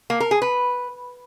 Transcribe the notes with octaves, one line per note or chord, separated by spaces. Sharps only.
A#3
A#4
G#4
B4